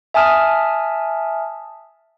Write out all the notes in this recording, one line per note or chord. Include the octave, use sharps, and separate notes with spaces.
E5 G#5 A5 D#6 F6